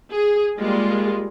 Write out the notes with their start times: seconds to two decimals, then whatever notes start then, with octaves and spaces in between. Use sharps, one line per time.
0.11 G#4
0.57 G3 G#3 A#3 F4 G#4